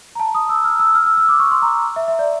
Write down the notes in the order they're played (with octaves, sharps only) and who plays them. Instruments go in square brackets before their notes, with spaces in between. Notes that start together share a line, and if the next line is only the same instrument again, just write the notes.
[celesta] A#5
A5
D#6
E6
F6
E6
F6
E6
E6
D6
C#6
C6
A#5
E5
E5
D5